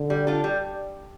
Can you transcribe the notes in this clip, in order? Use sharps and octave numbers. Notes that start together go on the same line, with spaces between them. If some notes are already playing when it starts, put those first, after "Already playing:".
Already playing: D3
G3
D4 F4 A4
G3